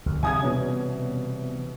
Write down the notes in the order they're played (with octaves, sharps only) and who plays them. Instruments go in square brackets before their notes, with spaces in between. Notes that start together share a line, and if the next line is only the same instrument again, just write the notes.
[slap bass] D2
[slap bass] C3 E3 G3 [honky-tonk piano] G#5 D#6 G#6
[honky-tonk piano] B2 C#4